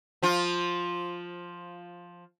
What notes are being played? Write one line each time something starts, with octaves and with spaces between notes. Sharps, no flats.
F3 F4